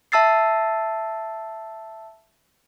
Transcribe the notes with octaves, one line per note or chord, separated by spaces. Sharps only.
E5 A5 E6 A6 C7